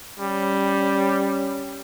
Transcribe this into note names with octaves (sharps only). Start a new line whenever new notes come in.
G3 C#4